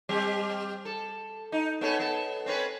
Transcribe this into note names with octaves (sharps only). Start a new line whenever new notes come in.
G3 C4 G4
A4
D#4
B3 C#4 A4
B3 A4
C4 C#4 B4